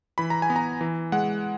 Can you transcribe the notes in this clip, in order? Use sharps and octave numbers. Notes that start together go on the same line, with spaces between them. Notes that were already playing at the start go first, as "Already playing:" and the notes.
E3 B5
A#5
G#5
B3
A#5
E3
G#3 F#5